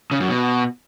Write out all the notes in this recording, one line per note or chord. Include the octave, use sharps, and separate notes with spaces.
C#3
F#2
B2